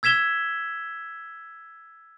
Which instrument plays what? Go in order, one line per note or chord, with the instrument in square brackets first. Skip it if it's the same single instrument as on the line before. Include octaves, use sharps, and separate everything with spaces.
[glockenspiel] E6 G#6 B6 E7 G7